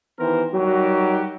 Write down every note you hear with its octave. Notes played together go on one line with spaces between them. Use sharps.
D#3 E3 B3 G4 A#4 C5
F#3 G3 D#4 F#4 G4 A#4